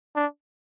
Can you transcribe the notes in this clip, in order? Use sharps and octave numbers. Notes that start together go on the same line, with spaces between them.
D4